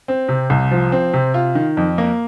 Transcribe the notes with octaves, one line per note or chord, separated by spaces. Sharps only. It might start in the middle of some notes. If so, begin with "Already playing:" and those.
C4
C3
C2
F3
C4
C3
F4
D#3
F2
A#3